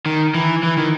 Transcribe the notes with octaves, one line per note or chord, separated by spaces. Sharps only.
D#3
E3
E3
D#3